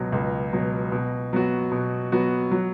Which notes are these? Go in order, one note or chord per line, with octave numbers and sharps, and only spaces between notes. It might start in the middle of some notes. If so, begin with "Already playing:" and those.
Already playing: C#2 B2 F#3
C#2
B2 F#3
B2
F#3 B3 F#4
B2
F#3 B3 F#4
F#3